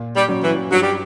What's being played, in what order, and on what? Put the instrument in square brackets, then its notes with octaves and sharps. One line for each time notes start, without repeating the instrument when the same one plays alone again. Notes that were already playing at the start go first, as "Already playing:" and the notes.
Already playing: [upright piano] A#2
[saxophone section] G3
[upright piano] F#3 C#4
[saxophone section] E3
[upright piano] G2 [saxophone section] F#3
[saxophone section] G3